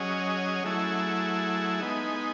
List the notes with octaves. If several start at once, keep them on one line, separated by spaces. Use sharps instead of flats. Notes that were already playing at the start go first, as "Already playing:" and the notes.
Already playing: F#3 C#4 G#4 D#5
F#3 A3 E4 G#4
G#3 B3 D#4